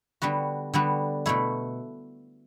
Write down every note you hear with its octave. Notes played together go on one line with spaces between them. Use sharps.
D3 G3 B3 F#4
D3 G3 B3 F#4
B2 A3 E4